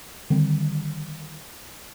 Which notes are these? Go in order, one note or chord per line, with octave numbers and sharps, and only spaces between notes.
D3 D#3 G3 C4